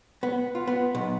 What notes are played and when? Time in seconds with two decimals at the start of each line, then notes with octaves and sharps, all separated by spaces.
0.23 B3
0.55 F4
0.67 B3
0.95 B1